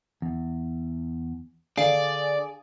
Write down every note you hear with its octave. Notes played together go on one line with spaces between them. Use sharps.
E2
D3 G#4 D5 F5 D7